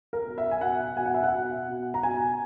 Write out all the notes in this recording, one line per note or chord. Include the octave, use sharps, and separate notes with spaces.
A#4
B2
E5
G#5
B2 F#5
B2 G#5
F#5
E5
F#5
B2
B2
A#5
B2 G#5